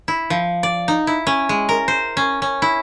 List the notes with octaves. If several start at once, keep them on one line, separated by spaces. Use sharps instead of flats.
E4
F3
D5
D#4
E4
C#4
G#3
A#4
C5
C#4
C#4
E4